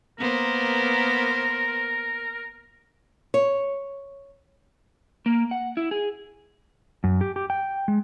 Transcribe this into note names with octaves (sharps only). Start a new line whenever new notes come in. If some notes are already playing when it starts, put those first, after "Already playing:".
A#3 B3 A#4 C5
C#5
A#3
F#5
E4
G#4
F#2
G4
G4
G5
G#3